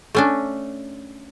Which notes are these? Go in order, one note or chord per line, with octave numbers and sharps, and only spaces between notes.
A3 C#4 D4